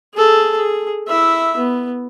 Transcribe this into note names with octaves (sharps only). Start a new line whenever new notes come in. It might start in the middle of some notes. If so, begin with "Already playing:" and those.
G#4 A4
G#4
E4 E5
B3